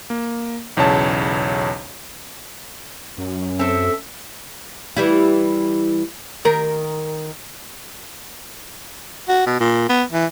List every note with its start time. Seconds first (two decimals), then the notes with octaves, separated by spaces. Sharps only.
0.10 A#3
0.77 B1 E2 C#3 C#5 A5
3.18 F#2 C#4
3.59 C4 A4 E5
4.97 E3 G3 E4
6.45 D#3 A#4
9.29 F#4
9.46 B2
9.60 A#2
9.89 B3
10.12 E3